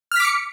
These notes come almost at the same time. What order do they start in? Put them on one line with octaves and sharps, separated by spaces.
F6 B6 D6 C#7